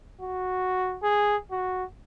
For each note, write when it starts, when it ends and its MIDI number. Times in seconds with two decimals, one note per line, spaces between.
0.21 0.98 66
1.03 1.36 68
1.51 1.84 66